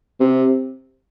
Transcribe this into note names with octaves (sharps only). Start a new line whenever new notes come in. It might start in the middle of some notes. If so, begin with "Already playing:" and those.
C3